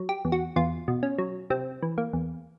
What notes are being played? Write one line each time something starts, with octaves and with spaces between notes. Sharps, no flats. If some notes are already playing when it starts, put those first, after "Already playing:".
Already playing: F#3
G4
E2
F#4
E2 F4
B2
C#4
F#3
C3 C4
E3
A#3
E2